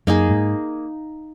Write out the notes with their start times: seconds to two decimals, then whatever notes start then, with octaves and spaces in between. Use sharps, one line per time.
0.07 F#2 A#3 D#4 G#4
0.29 G#2